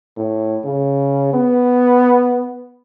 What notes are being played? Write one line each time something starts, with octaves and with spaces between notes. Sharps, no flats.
A2
C#3
B3